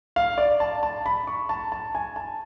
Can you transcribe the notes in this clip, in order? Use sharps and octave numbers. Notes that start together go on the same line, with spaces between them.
F5
D5
A5
A5
B5
C#6
A5
A5
G#5
A5